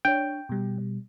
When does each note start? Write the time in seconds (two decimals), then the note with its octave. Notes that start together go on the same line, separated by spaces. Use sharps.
0.05 D4 C#5 G5
0.49 B2 G3